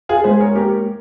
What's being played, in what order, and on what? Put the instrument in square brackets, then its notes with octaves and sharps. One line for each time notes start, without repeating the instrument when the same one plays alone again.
[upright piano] F4 G#4
[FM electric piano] G#3 [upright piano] G#4 C5
[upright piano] A#4 C#5
[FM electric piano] A#3 [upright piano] G4 A#4